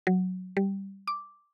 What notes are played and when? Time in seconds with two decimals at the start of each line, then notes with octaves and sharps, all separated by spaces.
0.07 F#3
0.57 G3
1.08 D6